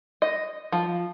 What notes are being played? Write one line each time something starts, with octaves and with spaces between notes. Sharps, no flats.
D#5
F3